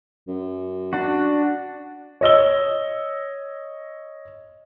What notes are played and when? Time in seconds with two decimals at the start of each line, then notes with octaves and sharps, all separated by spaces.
0.28 F#2
0.93 D4 F#4
2.21 C#5 D#5 E6 G7